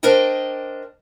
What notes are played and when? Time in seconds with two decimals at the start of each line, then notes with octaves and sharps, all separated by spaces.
0.03 D4 A#4 C5 D#5 G5